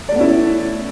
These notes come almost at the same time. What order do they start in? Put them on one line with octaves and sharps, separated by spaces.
D5 A3 B3 C#4 E4